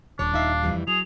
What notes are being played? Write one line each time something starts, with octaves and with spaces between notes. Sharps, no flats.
D#1 D4 C#5
D#4 E5 F5
F2 E3 G3
F#3 G#4 F7